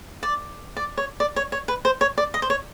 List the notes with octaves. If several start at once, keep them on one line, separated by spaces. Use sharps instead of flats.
D5
D5
C#5
D5
C#5
C#5
B4
C5
C#5
D5
D#5
C5
C#5